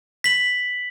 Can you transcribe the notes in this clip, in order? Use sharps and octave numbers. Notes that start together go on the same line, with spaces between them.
B6 F#7